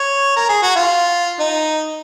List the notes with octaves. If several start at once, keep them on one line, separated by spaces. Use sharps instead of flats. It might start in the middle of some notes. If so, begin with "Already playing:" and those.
Already playing: C#5
A#4
G#4
F#4
F4
D#4